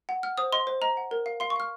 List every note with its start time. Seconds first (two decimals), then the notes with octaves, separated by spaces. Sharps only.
0.09 F#5
0.23 F#5 F6
0.38 C5 D#6
0.52 D#5 C6
0.67 C5
0.82 D#5 A#5
0.97 F#5
1.11 A#4
1.26 F5
1.40 F5 C6
1.50 C#6
1.56 F5 F6